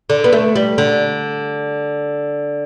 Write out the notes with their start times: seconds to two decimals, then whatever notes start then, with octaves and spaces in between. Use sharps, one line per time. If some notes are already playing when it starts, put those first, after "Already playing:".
0.10 D3
0.24 B3
0.32 A3
0.55 G3
0.78 D3